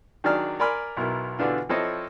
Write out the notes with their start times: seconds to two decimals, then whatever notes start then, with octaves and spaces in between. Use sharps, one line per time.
0.24 D#3 F#3 D4 G#4 D5 F6
0.60 A#4 D5 G#5 B5 C6 F6
0.97 B1 B2 E4 A#4
1.39 B2 D3 E3 D4 F4
1.69 F3 C4 E4 A4 C#5 D#5